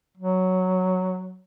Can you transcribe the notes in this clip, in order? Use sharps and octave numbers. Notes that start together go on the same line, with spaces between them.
F#3